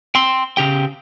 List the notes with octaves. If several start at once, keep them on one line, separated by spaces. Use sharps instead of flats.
G5 C6
C#3 G4 G5